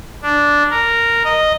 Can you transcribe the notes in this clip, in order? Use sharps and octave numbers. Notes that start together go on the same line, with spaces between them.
D4
A#4
D#5